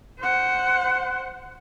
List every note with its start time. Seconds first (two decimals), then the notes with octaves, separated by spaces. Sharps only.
0.19 C5 F#5